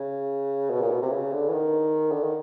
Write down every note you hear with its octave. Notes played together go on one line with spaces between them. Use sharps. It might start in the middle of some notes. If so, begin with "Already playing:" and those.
Already playing: C#3
B2
A#2
B2
C3
C#3
D3
E3
D#3
D3
D#3